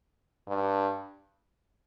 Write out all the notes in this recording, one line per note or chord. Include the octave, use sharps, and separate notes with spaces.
G2